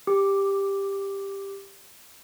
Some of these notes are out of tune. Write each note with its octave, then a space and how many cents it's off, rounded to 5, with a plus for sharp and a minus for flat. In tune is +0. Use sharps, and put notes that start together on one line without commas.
G4 +10 D6 +0